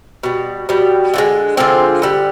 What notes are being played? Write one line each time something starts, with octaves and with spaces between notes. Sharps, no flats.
B2 G3
B2 G3
D3 F3 G#3
D3 F3 G#3 C4
D3 G3